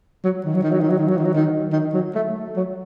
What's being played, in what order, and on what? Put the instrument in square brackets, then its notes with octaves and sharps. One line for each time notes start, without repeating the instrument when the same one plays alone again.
[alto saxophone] F#3
D#3
F#3
D#3
F#3
D#3
F#3
D#3
F#3
D#3
F#3
D#3
D#3
F#3
A3
F#3